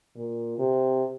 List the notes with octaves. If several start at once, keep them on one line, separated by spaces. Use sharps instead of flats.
A#2
C3